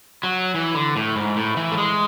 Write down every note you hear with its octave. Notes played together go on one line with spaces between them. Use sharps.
F#3
E3
D3
A2
G#2
A2
E3
A3
G#3